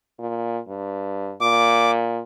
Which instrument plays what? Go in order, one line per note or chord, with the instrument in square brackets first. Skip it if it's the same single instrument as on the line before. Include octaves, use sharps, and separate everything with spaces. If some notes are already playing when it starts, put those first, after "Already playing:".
[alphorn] A#2
G2
[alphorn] A#2 [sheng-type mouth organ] D6